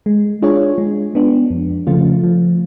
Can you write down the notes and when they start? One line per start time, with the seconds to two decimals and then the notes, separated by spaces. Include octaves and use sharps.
0.06 G#3
0.42 D4 F4 G#4 C#5
0.78 G#3
1.15 B3 D4
1.50 F2
1.87 C#3 F3 A3 F4
2.24 F3